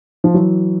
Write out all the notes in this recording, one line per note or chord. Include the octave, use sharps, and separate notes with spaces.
F3
E3 F#3